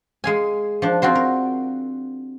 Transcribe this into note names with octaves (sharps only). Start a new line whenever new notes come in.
G#3 F5 G#5
F3 D4
C4 F4 F#4 C5
A#4